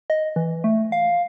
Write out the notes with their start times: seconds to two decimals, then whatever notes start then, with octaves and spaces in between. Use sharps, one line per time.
0.10 D#5
0.36 E3
0.64 A3
0.92 F5